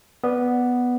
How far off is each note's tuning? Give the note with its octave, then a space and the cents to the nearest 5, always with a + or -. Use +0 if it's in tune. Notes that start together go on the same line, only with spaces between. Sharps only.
B3 +0 D5 +0